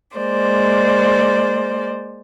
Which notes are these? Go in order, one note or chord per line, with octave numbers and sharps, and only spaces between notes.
G#3 A#3 C5 D5